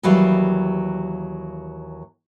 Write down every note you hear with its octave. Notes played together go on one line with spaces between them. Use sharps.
D#2 E3 F#3 G3 F5